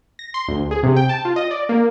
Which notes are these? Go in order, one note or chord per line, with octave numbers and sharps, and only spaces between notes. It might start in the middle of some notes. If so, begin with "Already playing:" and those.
A#6
C6
D2
G#4
C3
G5
A5
F4
D#5
D5
A#3